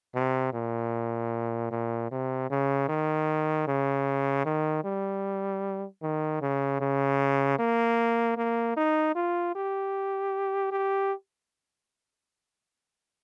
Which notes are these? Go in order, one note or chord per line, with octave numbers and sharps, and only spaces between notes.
C3
A#2
A#2
C3
C#3
D#3
C#3
D#3
G3
D#3
C#3
C#3
A#3
A#3
D#4
F4
G4
G4